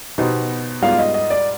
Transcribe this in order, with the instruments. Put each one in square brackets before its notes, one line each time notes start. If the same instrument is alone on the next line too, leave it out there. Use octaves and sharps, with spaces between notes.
[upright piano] B2 B3 D#4 G4 C5
[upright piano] G#2 G3 B3 F4 [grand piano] F5
[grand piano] D#5
D#5
D5